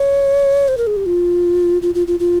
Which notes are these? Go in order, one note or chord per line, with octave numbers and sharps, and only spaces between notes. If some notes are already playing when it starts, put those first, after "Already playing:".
Already playing: C#5
C5
A#4
G#4
G4
F4
F4
F4
F4
F4